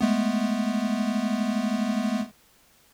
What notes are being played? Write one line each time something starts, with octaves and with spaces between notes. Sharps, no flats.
G#3 A3 B3